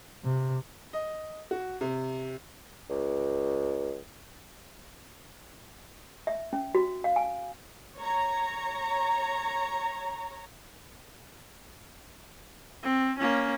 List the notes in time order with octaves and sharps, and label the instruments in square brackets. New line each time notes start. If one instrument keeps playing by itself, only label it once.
[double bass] C3
[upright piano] D#5
F#4
C3
[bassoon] C#2
[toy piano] E5
C#4
F#4
F5
G#5
[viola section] C#5 A#5
[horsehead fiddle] C4
A#3 C#4